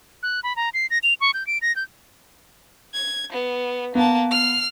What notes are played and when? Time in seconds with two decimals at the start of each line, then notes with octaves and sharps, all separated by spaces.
0.23 F#6
0.43 B5
0.56 A#5
0.74 C7
0.90 A#6
1.03 F7
1.21 C#6
1.34 G6
1.47 D7
1.62 A#6
1.76 G6
2.94 G#6
3.32 B3
3.95 A#3 B3 A5
4.31 F6 C7